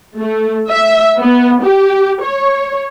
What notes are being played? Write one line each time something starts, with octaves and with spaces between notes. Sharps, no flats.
A3
E5
B3
G4
C#5